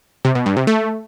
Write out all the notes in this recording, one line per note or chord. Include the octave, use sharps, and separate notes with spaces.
C3
B2
G2
C3
A3